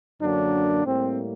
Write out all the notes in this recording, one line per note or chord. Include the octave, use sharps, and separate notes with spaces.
F#2 D3 F#3 A#3 D4
A2 G3 A#3 C4